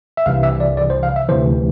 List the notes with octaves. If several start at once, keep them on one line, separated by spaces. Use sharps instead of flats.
E5
C2 C3 E3 F5
E5
D5
D5
C5
F5
E5
D2 C3 E3 C5